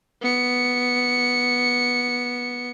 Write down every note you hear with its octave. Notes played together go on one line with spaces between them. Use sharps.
B3 C#7